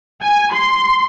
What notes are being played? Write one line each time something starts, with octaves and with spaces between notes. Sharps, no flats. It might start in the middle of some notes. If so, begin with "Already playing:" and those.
G#5
C6